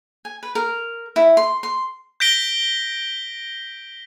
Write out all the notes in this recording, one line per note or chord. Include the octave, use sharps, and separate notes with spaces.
G#5
B4
A#4
E4
C6
C6
G6 A#6 B6 D7 G7